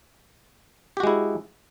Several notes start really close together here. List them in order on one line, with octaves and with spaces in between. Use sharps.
G4 F#4 G#3 E4